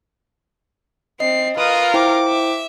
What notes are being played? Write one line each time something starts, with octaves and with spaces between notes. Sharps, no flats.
C4 D#5 C7
F4 A#4 B4 D#6
E4 C5 G5 D6
E5